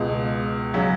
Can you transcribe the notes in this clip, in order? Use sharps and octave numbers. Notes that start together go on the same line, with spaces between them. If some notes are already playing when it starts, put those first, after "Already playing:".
Already playing: C#2 B2 G#3
C#3 F#3 C#4